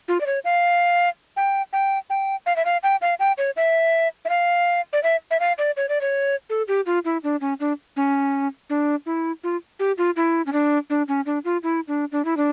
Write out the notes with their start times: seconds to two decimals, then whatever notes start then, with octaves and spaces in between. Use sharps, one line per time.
0.08 F4
0.21 D5
0.26 C#5
0.45 F5
1.37 G5
1.73 G5
2.10 G5
2.46 F5
2.56 E5
2.65 F5
2.83 G5
3.02 F5
3.20 G5
3.38 C#5
3.57 E5
4.25 E5
4.29 F5
4.93 D5
5.03 E5
5.31 E5
5.40 F5
5.58 D5
5.77 C#5
5.89 D5
6.01 C#5
6.50 A4
6.68 G4
6.86 F4
7.05 E4
7.23 D4
7.41 C#4
7.60 D4
7.96 C#4
8.70 D4
9.06 E4
9.44 F4
9.79 G4
9.98 F4
10.16 E4
10.46 C#4
10.53 D4
10.90 D4
11.08 C#4
11.26 D4
11.45 F4
11.63 E4
11.88 D4
12.12 D4
12.25 E4
12.37 D4